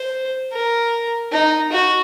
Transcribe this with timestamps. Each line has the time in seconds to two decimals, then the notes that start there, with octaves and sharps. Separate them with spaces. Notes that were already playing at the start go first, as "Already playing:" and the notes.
Already playing: C5
0.52 A#4
1.32 D#4
1.72 F#4